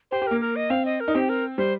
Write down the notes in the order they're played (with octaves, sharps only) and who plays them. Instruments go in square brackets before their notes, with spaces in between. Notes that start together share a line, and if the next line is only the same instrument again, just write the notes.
[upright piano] G4 [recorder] C5
[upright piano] G4
[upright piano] A#3 [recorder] A#4
[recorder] A#4
D#5
[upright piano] C4 [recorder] F5
[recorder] D#5
A#4
[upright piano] D#4
[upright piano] C4 [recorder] G4
[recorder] A#4
[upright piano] G3 [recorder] C5